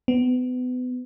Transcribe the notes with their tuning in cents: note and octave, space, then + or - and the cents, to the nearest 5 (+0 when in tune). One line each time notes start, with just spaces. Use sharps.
B3 +30